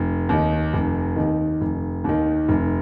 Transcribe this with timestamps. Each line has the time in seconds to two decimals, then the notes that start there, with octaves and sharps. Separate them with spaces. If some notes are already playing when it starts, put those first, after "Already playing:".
Already playing: F1
0.29 D#2 D#3
0.73 F1
1.16 D#2 D#3
1.61 F1
2.04 D#2 D#3
2.48 F1